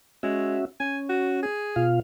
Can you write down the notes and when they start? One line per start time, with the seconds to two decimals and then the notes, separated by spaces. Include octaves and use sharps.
0.23 G#3 C#4 F#4 E5
0.80 C#4 G#5
1.09 F#4
1.43 G#4
1.76 B2 F4 F5